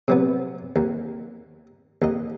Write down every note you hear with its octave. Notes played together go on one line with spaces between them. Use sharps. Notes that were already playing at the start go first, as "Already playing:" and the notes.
C3 F#3 B3
D#2
D#2 D#5